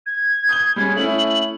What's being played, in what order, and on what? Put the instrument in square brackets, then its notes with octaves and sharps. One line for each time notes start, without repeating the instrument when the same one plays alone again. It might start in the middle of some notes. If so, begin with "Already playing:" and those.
[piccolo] G#6
[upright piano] D#6 G6 G7
G3 G#3 C#4
[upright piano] A3 C#4 E4 [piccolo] F#7